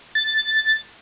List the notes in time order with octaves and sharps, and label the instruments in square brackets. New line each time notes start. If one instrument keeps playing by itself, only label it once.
[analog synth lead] A6